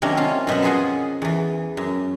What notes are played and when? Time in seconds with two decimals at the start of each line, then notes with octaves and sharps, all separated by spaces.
0.02 C3 D#3 F#3 A#3 C#4 D4
0.17 C#4 F4
0.47 F#2 B2 E5 F#5
0.62 F3 A#3 F4 G#4 F#5 G#5
1.22 E2 E3
1.77 F#2